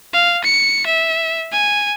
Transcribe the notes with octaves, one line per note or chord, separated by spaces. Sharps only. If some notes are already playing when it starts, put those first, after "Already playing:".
F5
C#7
E5
G#5